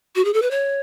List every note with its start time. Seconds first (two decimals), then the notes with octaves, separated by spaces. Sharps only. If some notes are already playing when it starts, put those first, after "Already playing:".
0.15 F#4
0.25 G#4
0.33 A4
0.42 B4
0.51 C#5